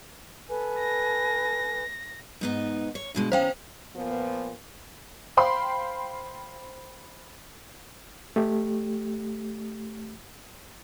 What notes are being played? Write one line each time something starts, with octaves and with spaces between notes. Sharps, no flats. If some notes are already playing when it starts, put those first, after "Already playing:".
A4 B4 G#5
A#6
G#2 B3 D#4
C#5
G2 B2 G#3
E3 C#4 C5 F5 G5
A#2 F3 B3
C5 F5 G5 B5 C6
A3 G4